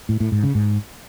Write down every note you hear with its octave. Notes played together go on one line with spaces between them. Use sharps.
A2
A2
G#2
C#3
G#2